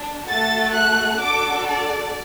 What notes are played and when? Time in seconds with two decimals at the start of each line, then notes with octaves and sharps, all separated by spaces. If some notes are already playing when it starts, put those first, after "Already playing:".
Already playing: D4
0.27 A3 F#4 A4 A6
0.74 F#6
1.19 D4 F#4 A4 D6
1.65 D5